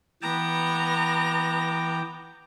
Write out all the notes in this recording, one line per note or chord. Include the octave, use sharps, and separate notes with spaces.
E3 B3 G5 A#5 D6